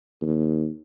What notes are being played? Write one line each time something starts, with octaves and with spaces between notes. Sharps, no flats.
D#2